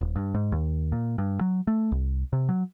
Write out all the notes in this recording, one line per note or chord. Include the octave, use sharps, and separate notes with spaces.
D#1
G2
G#2
D#2
A#2
G2
F#3
A3
C2
C3
F#3